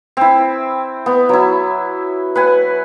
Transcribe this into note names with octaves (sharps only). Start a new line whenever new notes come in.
C4 E4
B3
F#3 E4
B4 F#5 G#5